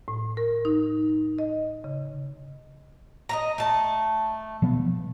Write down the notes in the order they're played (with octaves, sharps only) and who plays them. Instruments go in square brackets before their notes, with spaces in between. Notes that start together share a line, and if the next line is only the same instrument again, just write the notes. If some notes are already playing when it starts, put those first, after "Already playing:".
[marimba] A2
A#4
D#4
D#5
C#3
[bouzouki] D#5 E5 A#5
A3 A5
[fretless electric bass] B2 F3 B3